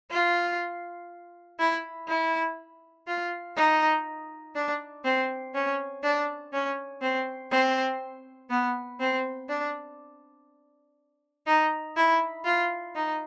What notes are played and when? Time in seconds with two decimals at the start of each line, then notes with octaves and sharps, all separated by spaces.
0.11 F4
1.59 E4
2.09 E4
3.07 F4
3.57 D#4
4.55 D4
5.05 C4
5.54 C#4
6.03 D4
6.53 C#4
7.02 C4
7.52 C4
8.50 B3
9.00 C4
9.49 D4
11.47 D#4
11.97 E4
12.45 F4
12.95 D#4